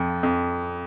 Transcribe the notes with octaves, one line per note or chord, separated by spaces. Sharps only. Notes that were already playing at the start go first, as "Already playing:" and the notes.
Already playing: F2 F3
F2